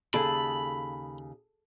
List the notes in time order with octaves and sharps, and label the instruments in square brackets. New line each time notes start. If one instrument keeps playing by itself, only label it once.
[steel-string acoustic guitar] D#2 C#3 [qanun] G#4 A4 [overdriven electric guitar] B5